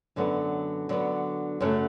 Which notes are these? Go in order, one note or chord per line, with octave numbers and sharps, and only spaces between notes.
F#2 D3 F#3 B3
D3 F#3 B3
F#2 C#3 F#3 A3